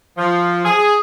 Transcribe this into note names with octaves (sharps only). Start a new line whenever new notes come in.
F3
G#4